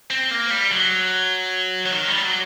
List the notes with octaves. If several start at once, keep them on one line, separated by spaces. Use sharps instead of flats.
C4
A#3
G3
F#3
F#3
D#3
G3
F#3